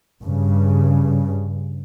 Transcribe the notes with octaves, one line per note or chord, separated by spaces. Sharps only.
G2 C#3